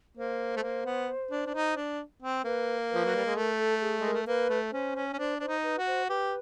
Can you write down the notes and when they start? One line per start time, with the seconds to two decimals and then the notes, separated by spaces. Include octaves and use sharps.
0.17 A#3 C5
0.56 A3
0.63 A#3
0.85 B3
1.31 D4
1.46 D4
1.55 D#4
1.76 D4
2.22 C4
2.44 A#3 B4
2.91 F3 B4
3.05 F#3
3.16 G3
3.26 G#3
3.36 A3 A#4
3.59 A4
3.81 G#4
4.01 G#3 A#4
4.14 A3
4.27 A#3 B4
4.50 A3
4.72 C#4 C5
4.95 C#4
5.13 C#4
5.18 D4 C5
5.40 D4 C5
5.48 D#4
5.63 B4
5.78 F#4
5.87 C5
6.09 G4 B4